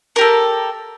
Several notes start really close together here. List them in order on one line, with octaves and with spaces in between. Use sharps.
A#4 G4 A4